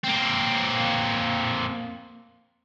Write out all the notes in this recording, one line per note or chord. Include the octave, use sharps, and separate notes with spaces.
A#3 C4